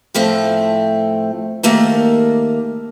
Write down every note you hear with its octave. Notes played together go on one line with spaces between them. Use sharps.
A2 F3 A3 C4
D#3 A3 A#3 G4 A#4